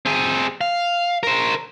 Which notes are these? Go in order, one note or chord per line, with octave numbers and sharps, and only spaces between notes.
C4 G#4
F5
A#4 C5